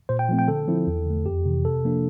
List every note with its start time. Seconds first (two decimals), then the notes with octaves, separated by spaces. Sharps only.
0.09 A#2 C5
0.19 G5
0.29 F3 A3 C4
0.39 G5
0.48 D3 A4
0.68 F3 C4 E4
0.87 E2
1.06 D3 A3
1.26 F2 G4
1.46 C3 E3
1.65 C3 A4
1.84 F3 A#3 D4